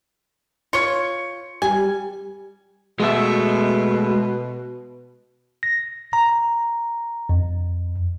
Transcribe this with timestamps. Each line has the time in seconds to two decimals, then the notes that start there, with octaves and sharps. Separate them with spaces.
0.73 F4 C#5 C#7
1.62 G3 G#5
3.00 B2 G#3 A3 E5
5.63 A#6
6.13 A#5
7.29 F2